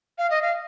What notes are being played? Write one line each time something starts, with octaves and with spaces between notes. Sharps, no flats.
F5
D#5
F5